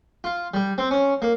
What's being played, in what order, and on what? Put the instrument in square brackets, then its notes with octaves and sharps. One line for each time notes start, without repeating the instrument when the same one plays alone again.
[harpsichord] F4
G3
C4
C#4
A#3